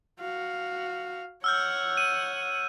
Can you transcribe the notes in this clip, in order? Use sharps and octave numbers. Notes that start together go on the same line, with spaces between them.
F#4 F5
C#5 F#5 E6 F6 G6
D#7